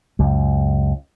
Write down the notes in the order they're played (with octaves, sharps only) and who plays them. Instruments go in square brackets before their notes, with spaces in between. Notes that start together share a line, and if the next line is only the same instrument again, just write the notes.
[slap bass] C#2 F#2